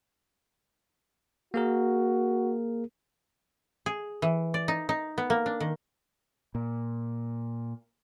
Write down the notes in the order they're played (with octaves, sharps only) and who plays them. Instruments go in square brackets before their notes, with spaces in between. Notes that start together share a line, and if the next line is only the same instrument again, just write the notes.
[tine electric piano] A#3 G#4 A#4 [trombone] F#4
[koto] G#4
E3
D5
D#4
D#4
B3
A#3
D4
D#3
[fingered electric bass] A#2